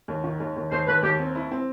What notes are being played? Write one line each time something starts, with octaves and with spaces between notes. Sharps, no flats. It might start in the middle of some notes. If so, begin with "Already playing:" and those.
D#2
D#3
D#2
D#2
D#2 C5
D#2 B4
D#2 G4
C4
E4
C4